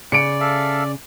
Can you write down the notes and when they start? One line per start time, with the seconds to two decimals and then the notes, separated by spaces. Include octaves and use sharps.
0.12 C#3 D5 C#7 D7
0.41 A4 E5 F5